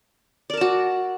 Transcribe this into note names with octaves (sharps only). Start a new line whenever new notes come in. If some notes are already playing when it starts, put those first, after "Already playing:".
F#4 A#4 D5 A5